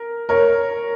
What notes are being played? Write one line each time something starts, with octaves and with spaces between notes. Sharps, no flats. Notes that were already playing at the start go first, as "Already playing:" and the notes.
Already playing: A#4
A#4 C#5